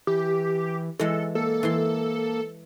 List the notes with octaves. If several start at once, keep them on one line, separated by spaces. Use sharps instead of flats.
E3 G4
E3 G#3 A4
A#3 A4
E3 C6